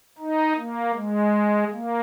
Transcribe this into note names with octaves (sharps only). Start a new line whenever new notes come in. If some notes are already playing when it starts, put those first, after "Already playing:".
D#4
A#3
G#3
A#3